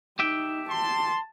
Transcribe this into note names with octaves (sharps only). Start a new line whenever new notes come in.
D#4 G4 E5 G5
A5 C6